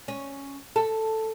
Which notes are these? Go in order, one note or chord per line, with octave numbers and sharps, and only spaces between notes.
C#4
A4